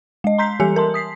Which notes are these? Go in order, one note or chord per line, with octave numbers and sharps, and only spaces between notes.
G#3 D#5
A#5 C6 G6 B6 C7
E3 G3 G4 A4 G#5 C#7
A#4 A5 C6
D#6 B6 C7